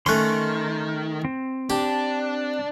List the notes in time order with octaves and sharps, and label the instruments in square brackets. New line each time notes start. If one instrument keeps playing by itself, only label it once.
[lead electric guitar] D#3 [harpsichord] A3 C#4 [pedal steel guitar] C6 F#6
[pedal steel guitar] C4
[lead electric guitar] D4 [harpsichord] G4